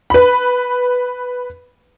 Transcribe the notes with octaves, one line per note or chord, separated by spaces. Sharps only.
B4 B5